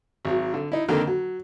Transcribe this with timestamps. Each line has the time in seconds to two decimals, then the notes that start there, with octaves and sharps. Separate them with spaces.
0.25 G#1 F#3
0.54 D3
0.72 D#4 E4
0.88 F2 D3 D#3 A#3
1.07 F#3